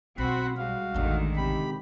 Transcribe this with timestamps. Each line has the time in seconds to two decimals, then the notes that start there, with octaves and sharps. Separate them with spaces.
0.18 B1 C4 F#4 F#5 B5
0.57 G3 G#3 F#4 F5
0.94 A1 E2 D3 D#3 G#3
1.36 C3 G4 B5